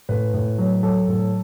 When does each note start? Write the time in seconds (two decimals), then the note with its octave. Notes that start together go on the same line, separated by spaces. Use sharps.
0.09 A2 B4
0.34 A2
0.58 F#3
0.83 F#3 A4
1.08 A2